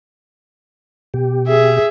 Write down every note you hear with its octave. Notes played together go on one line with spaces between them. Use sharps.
B2 G4
G#4 E5